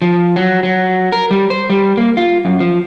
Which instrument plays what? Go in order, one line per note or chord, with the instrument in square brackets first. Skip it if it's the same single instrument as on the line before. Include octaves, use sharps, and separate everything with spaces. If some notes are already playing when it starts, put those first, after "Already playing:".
[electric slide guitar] F3
F#3
F#3
A#4
G3
C5
G3
A#3
F4
F#2
F3